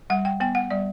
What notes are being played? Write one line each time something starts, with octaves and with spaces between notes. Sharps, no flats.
G3 F#5
G5
B3 G5
F#5
G3 D5